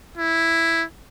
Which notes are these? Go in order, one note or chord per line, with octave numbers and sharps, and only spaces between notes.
E4